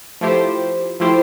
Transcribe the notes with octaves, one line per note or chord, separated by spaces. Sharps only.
F3 A3 E4 G4 C5
F3 A3 E4 G4 C5